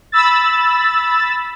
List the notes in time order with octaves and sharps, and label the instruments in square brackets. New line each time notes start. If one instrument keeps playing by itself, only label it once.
[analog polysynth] B5 E6 A6